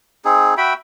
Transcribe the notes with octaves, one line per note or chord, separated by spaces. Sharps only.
C4 D#4 G#4
F#4 E5 G5 B5